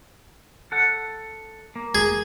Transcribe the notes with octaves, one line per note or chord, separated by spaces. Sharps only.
A4 F#5
A#3
G#4